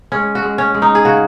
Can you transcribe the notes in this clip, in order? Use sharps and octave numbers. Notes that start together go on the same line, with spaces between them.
G#3 C#4
F#4
G#3
C#4
G#3
D#4
G#4
C#3 F#4